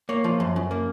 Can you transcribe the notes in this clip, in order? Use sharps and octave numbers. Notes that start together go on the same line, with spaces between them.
A#3 C#5
F3
F#2
F#2
A#3